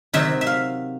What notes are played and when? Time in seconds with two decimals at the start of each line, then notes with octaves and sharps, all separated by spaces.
0.13 C3 D#3 F#3 E5
0.41 E5
0.47 F5